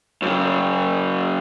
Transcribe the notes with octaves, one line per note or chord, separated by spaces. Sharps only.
F#2 C#3